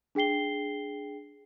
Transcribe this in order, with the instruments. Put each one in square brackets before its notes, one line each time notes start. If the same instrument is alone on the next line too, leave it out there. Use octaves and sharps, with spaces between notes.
[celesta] D4 G#4 G5 C7 G7